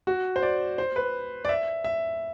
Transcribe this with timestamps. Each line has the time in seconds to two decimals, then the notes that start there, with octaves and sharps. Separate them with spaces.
0.07 F#4
0.36 C5
0.42 D5
0.78 C5
0.96 B4
1.45 D5
1.49 E5
1.84 E5